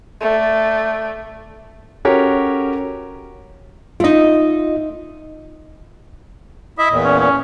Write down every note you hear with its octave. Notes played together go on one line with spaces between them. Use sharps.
A3 D5
C#4 F#4 G4 A4 A#4 C#5
A3 D#4 F4 D#5
E4 D#5 E5
E2 A#2
C#4
C#4